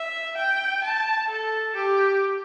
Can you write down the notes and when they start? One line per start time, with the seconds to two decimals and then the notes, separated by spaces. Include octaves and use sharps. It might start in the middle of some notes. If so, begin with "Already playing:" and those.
Already playing: E5
0.37 G5
0.84 A5
1.30 A4
1.76 G4